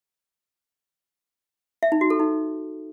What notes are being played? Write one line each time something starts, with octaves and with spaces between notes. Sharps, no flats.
E5
D#4
F#4
A4
D#4